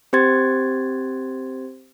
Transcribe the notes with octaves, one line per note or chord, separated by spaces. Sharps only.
C4 G4 C5 C6 G#6 A6